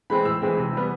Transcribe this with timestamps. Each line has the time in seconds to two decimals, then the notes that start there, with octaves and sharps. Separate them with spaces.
0.10 E3 G#3 C4 B5
0.25 A2 E6
0.42 E3 G#3 C4
0.57 C3
0.73 E3 G3 B3